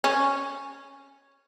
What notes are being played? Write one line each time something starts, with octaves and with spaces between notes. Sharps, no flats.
C#4